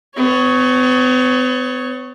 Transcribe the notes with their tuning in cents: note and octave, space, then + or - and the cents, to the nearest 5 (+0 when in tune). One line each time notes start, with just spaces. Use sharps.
B3 +45 C#5 +0